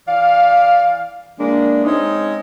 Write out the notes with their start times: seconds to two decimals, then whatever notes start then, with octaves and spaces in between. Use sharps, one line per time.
0.07 E3 D5 F5
1.39 E3 G#3 A#3 D4
1.85 G#3 C4 C#4 D#4